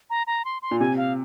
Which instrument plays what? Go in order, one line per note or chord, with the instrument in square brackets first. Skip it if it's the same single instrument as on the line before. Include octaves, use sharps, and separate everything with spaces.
[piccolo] A#5
A#5
C6
C6
[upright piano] A#2
[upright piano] C3 [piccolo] G#5
[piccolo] F5